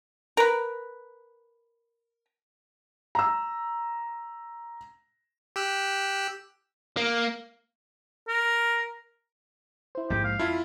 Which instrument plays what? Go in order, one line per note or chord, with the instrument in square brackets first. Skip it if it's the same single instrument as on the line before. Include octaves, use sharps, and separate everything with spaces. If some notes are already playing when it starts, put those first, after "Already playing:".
[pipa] A#4 B4
[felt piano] A#5 E6
[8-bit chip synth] G4 E6 F#6
[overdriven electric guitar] A#3
[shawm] A#4
[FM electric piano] E4 C5
[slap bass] A#1 G#2 G#3 [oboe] G4
[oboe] F5
[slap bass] F2 [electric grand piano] E4 F4 [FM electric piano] A5 B5